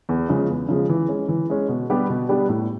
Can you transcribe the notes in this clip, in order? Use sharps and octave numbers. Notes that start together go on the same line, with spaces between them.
E2
C#3 F3 G#3
E2
C#3 F3 G#3
E3
G#3 C#4
E3
G#3 C#4
B2
G3 B3 D4 G4
B2
G3 B3 D4 G4
A2